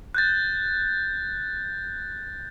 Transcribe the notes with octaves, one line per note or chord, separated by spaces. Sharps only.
F#6 G6 A6